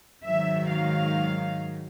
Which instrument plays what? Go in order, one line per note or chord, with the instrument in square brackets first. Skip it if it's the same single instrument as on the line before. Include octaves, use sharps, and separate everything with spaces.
[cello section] G#2 D#3 F#3 E5
F5